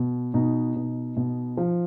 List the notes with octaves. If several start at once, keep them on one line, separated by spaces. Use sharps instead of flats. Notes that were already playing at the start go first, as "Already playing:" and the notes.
Already playing: B2
B2 D#4
B2
B2
F3